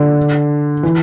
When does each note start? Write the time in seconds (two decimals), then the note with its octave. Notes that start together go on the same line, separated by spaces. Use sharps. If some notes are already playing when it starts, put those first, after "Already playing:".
Already playing: D3
0.83 E3